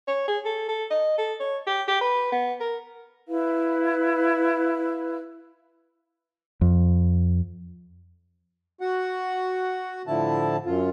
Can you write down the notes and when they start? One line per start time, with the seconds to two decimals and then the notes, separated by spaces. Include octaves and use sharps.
0.07 C#5
0.28 G#4
0.45 A4
0.69 A4
0.90 D#5
1.18 A4
1.40 C#5
1.67 G4
1.88 G4
2.01 B4
2.32 B3
2.60 A#4
3.27 E4 B4 F5
6.61 F2
8.81 F#4 F#5
10.07 A2 D3 F3 E4 A5
10.66 F#2 F4